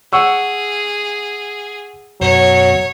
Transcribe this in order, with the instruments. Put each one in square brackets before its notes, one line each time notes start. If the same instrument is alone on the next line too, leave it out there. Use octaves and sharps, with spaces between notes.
[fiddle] G#4 [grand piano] F#5 C#6 E6
[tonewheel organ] F#2 B2 [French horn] F#3 [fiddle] C#5